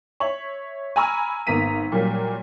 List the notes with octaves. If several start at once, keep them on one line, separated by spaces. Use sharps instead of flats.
C#5 E5 F#7
G#5 A#5 B5 C#6 E6 F6
G#1 A#3 B3 A#5 B6 D#7
A#2 F#3 G3 A#3